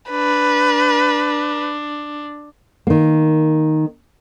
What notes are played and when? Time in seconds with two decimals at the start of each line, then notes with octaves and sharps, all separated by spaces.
0.11 D4 B4
2.87 D#3 A#3